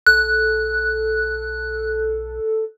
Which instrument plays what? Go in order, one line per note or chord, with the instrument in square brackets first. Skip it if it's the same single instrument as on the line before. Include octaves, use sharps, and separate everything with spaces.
[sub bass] B1 [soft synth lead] A4 [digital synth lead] F#6